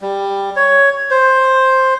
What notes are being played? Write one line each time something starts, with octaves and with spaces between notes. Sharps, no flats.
G3
C#5
C5